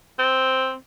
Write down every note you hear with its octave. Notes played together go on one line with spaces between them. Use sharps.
C4